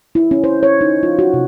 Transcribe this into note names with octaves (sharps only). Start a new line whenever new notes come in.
E4
C#4
C5
C#5
D#4
F4
F#4
C3